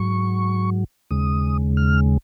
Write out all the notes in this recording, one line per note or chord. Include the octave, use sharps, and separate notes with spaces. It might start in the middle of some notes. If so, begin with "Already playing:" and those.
Already playing: G#2 F#3 C#6
D#2 C#3 G#3 D#6
F6